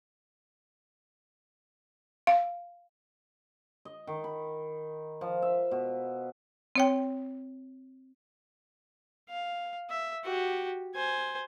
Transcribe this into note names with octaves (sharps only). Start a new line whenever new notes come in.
F5
D#5
D#3
B5
F3
E5
B2
C4 C#5 G5
F5
E5
F#4 G4
C5 G#5